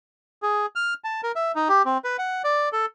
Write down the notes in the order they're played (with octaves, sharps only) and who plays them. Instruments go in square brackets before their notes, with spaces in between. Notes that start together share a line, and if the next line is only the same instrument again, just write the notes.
[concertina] G#4
F6
A5
A#4
E5
D#4
G4
C4
B4
F#5
D5
A4